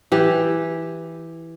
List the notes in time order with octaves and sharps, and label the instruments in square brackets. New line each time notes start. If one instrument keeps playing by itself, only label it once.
[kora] E3 G4